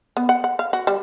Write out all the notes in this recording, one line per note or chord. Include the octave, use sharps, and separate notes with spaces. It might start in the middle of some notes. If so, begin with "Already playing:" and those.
B3
F#5
F#5
F5
F#4
G3